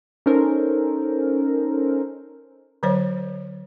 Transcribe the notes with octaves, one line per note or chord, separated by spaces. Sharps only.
C#4 D#4 A4 A#4 C5
D3 F#3 C5 C#5